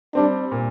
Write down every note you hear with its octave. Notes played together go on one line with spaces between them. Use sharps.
G3 C4 D4
A#2